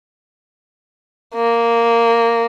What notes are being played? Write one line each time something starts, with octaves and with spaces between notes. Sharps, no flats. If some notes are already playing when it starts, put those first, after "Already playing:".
A#3